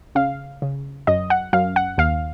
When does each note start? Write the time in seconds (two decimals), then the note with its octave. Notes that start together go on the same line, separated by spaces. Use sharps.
0.15 C#3 F5
0.62 C#3
1.07 F#2 D#5
1.30 F#5
1.53 F#2 F5
1.76 F#5
1.98 D#2 F5